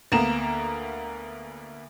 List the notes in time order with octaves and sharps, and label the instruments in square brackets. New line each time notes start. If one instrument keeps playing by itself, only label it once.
[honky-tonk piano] D2 A#3 B3 A#5 E7